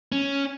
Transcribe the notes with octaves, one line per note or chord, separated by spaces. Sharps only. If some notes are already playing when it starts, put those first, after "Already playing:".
C#4